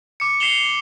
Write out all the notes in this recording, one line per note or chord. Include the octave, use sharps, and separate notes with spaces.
D6 C#7
C7 C#7 E7 F7 G7